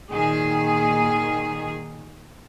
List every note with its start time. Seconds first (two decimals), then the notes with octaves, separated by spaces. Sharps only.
0.11 A#2 D#3 G#4